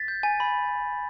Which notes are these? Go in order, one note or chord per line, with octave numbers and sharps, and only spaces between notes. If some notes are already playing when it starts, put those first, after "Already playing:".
Already playing: A6 B6
G6
G#5
B5